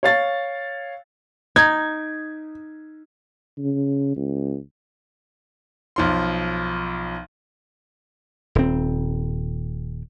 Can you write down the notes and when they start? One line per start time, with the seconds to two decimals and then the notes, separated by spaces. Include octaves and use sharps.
0.03 C#5 F5 A6
1.56 D#4 G#6
3.59 C#3
4.16 C#2
5.96 B1 F3 C6
8.55 D#1 C4